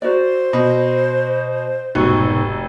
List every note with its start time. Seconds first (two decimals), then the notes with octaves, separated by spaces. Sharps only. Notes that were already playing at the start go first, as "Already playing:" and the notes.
0.02 F#4 A#4 C5 D5
0.53 B2 B5
1.95 F1 G#2 B2 F#4 C#6